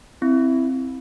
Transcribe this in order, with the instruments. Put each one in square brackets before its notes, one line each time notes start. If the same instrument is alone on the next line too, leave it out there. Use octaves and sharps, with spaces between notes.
[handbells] C4 [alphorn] E4